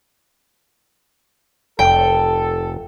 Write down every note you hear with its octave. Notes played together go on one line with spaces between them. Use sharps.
F1 A4 G5